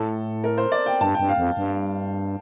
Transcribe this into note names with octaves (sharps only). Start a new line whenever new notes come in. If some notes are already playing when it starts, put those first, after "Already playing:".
Already playing: A2 A4
A#4
C5
D5
G5
G2 A5
G2 G5
F5
F2
G2